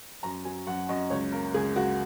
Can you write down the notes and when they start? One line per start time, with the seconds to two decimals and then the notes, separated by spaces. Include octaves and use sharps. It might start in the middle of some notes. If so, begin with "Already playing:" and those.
0.23 F#2 A#5
0.45 F#3 G#5
0.67 F#2 F#5
0.89 F#2 D#5
1.10 C#2 C#5
1.32 A#3 A#4
1.54 C#2 G#4
1.76 C#2 F#4